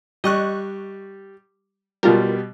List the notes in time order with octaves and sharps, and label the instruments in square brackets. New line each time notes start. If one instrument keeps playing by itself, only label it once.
[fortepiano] G3 [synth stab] D#5 C#6 F#6
[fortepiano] B2 G3 [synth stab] F4 A#4